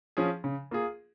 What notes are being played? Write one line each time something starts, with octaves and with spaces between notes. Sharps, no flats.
F3 C#4 G#4
C#3
A#3 F4 G#4